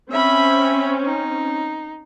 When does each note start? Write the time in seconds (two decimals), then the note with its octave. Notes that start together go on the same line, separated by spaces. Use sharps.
0.11 C4 C#4 E5 B5
1.04 D#4